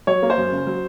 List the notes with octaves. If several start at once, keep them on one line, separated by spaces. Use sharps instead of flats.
F#3 C#5
A#3
C5
F#2
C#3
F#3